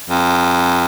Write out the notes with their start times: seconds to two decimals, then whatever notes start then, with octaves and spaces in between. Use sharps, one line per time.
0.10 F2